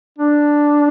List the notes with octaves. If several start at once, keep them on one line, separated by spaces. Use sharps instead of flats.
D4